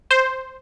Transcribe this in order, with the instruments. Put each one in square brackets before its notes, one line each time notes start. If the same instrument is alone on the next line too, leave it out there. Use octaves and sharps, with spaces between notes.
[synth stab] C5